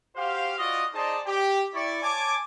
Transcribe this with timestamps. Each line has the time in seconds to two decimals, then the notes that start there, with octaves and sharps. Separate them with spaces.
0.16 F#4 G4 C5 F5
0.59 F4 F#4 D5 D#5
0.94 D#4 G#4 C5 D5 D#5 A5
1.26 G4
1.74 E4 D5 C#6
2.03 C#5 G#5 A5 D6